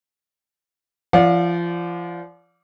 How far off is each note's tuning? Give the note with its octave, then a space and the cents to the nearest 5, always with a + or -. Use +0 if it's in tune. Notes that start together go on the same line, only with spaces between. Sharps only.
F3 -30 D5 -25 F5 +45